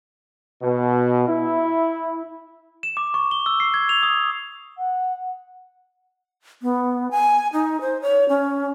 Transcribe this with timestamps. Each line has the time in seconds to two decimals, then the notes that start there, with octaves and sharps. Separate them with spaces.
0.62 B2
1.27 E4
2.83 E7
2.97 D6
3.14 C#6
3.31 G7
3.46 E6
3.60 C7
3.74 G#6
3.89 F7
4.03 D#6
4.78 F#5
6.62 B3
7.11 G#5
7.53 D#4
7.81 C5
8.02 C#5
8.29 C#4